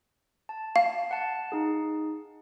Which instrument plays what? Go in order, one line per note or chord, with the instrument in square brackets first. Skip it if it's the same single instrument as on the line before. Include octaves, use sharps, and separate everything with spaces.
[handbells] A5
[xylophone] F5
[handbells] F#5 A5
D#4 G#4